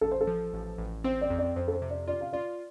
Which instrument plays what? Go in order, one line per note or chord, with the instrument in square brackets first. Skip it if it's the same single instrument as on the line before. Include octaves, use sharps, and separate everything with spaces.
[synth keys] A1 [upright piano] A4
[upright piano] C5
A4
[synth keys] F3
A1
A1
[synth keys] C4 [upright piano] C5
[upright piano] D5
[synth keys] F2
[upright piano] D5
[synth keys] F2 [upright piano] C5
[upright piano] A4
C5
[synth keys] C3
[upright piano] D5
[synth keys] F4 [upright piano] D5
[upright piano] F5
[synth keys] F4 [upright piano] D5